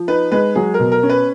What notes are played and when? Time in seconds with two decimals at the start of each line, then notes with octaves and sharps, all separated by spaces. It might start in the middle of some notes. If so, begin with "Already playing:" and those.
Already playing: F3
0.08 D#4 B4
0.32 G#3 B4
0.55 F#3 G#4
0.74 A#4
0.79 B2
0.92 A#4
1.03 C#4
1.10 B4